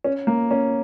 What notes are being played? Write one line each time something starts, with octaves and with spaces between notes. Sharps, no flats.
C#4
A#3
C#4